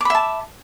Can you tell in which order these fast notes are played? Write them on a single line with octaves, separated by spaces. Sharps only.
D6 B5 E5 A5